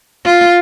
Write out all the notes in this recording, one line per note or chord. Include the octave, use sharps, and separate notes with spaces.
F4